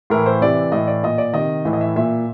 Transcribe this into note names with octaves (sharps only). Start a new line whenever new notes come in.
A2 E3 A#4
C5
C3 E3 D5
A2 E3 D#5
D5
A#2 D#5
D5
C3 D#3 D#5
A2 E3 E5
D#5
E5
A#2 E5